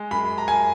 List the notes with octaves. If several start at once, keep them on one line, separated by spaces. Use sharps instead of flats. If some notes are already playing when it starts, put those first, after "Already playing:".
Already playing: G#3
F#2 B5
A#5
F#2 G#5